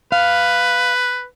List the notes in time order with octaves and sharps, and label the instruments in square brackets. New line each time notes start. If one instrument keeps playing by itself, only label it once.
[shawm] B4 [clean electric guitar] F5